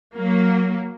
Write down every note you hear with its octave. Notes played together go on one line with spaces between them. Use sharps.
F#3 A#3